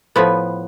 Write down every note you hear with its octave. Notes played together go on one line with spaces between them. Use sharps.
A2 F3 B3